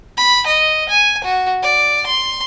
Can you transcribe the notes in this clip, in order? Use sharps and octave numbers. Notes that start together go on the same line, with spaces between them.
B5
D#5
G#5
F#4
D5
C6